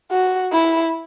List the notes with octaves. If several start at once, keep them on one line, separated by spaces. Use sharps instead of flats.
F#4
E4